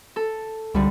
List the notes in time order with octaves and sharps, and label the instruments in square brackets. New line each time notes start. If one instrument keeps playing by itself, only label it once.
[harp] A4
[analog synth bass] C#2 [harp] D3 G3